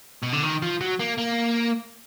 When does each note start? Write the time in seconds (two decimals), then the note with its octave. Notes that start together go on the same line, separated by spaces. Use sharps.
0.23 B2
0.33 D3
0.43 D#3
0.62 F3
0.81 F#3
0.99 A#3
1.18 A#3